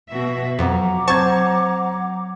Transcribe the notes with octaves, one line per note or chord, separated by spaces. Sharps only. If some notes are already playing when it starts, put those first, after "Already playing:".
B2 F#4 E5
F2 F#3 F#5 A#5 D6
C4 A5 C#6 G#6 A6